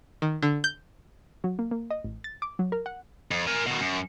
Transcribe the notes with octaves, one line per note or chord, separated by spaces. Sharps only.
D#3
D3
G6
F#3
A#3
A#3
D#5
A1
A6
D6
F#3
A#4
F#5
F2
A#4 G#5
B2 D#3
F#2